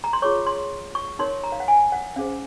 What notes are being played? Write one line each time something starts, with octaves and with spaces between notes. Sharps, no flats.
A#5
C6
F4 G#4 C#5 C#6
C6
C#6
D#4 A#4 C#5 C6
A#5
F5
F#5
G#5
F#5
C#4 G#4 C5 F5